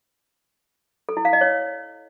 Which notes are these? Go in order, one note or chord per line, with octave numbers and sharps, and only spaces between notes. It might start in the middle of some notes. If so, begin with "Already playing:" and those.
A4
E4
F5
D#5
C#5